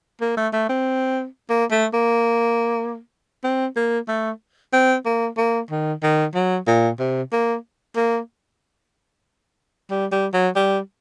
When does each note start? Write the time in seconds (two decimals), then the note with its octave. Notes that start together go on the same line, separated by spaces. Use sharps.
0.21 A#3
0.37 A3
0.53 A3
0.69 C4
1.50 A#3
1.71 A3
1.93 A#3
3.44 C4
3.76 A#3
4.08 A3
4.73 C4
5.05 A#3
5.38 A#3
5.71 D#3
6.03 D#3
6.35 F#3
6.67 A#2
6.99 C3
7.33 A#3
7.96 A#3
9.91 G3
10.12 G3
10.34 F#3
10.56 G3